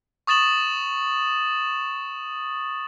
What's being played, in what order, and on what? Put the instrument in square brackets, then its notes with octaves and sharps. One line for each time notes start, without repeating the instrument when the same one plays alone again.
[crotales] C#6 D#6 A6 E7 F#7